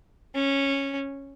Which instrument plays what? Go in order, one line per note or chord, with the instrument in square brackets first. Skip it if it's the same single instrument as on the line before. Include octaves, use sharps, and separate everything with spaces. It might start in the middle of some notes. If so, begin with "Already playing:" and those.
[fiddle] C#4